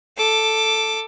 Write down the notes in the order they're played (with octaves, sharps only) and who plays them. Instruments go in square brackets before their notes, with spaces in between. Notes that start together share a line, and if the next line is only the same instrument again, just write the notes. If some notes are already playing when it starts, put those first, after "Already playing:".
[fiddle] A4 D6